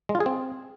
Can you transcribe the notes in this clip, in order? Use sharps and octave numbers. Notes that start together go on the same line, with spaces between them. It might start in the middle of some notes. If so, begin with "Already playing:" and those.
G#3
F4
G#4
C4